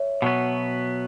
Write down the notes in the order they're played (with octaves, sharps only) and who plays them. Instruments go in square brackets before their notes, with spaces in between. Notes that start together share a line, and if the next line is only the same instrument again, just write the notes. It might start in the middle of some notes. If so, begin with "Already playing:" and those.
Already playing: [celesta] C#5 E5
[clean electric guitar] B2 F#3 B3